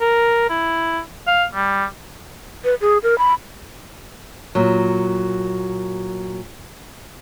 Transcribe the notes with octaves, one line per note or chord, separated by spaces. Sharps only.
A#4
E4
F5
G3
B4
G#4
A#4
B5
A#2 F#3